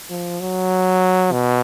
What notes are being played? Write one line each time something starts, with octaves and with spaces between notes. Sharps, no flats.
F3
F#3
B2